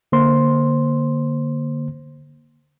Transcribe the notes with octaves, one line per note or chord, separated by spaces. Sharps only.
D3 A#3 C5 C6